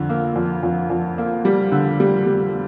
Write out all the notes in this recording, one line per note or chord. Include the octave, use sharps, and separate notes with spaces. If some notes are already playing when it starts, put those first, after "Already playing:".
Already playing: F2 D3
A#3
F2
F2
F2
A#3
G3
D3
G3
G3